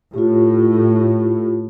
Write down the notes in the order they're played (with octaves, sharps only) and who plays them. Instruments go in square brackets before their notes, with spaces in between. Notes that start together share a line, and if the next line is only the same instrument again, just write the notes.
[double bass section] A2 [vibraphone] F4 G4